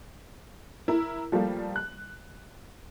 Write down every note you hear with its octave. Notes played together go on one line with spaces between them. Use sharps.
E4 A#4
F3 G3 A3 A#3
F#6